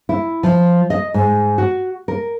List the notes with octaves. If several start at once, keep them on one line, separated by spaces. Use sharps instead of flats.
E4
F3
D#5
G#2
F#4
A#4